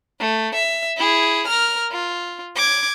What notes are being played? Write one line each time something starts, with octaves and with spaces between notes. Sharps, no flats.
A3
E5
E4 G#4
A#4 F6
F4
D6 G#6